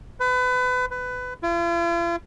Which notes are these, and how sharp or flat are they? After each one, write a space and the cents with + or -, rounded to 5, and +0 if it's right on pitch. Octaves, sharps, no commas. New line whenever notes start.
B4 +30
B4 +20
F4 -45